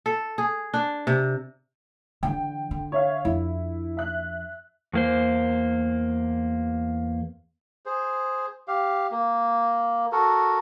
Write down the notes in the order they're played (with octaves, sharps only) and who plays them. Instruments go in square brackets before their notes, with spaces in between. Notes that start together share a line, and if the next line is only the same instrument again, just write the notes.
[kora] A4
G#4
D4
C3
[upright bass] D3 E3 [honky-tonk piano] G5
[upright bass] D3
[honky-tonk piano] C#5 E5 F5
[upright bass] F2 D4 [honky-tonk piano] E4
[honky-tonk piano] E5 F#6
[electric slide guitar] E2 A#3 C5
[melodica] G#4 C5
G4 F5
A#3
F#4 A4 A#4